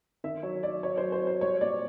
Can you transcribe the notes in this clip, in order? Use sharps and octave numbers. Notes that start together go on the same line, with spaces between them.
D#3 E5
F#3 C#5
F#3 D5
F#3 C#5
F#3 C5
C5
F#3
C5
G3 C#5
A#2 D5